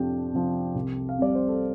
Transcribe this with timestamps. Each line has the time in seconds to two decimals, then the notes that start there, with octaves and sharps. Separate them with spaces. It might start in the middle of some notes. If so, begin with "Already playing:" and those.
Already playing: F2 C3 F3 D4 G4 G5
0.33 C3 F3
0.75 C2
1.09 F5
1.18 C3 G3 D5
1.35 C5
1.48 A4